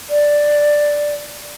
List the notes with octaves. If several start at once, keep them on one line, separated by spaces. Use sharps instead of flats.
D5